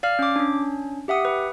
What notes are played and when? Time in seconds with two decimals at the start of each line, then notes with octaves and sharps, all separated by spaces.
0.03 D5 F5 F6
0.19 C#4 D6
0.36 C#4 D4
1.08 G4 E5 F#5 D#6
1.25 B4